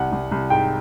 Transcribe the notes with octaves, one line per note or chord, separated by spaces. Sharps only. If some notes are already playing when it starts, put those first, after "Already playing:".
Already playing: C2 F#5
C2
C2
G#2 G5